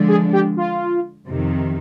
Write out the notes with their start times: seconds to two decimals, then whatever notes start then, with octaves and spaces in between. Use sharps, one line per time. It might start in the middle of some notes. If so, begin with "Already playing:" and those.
Already playing: D3 F3 G#3 D4
0.08 G#4
0.33 G4
0.57 F4
1.28 F2 C3 D#3